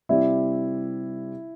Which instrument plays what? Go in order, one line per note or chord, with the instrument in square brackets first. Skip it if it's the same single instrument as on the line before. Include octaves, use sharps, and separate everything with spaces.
[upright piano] C3 G3 C4 G4 D5 [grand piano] E4